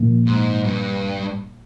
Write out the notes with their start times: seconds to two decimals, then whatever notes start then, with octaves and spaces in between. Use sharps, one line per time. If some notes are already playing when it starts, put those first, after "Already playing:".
Already playing: A#2 F3 A#3
0.26 G#2
0.64 G2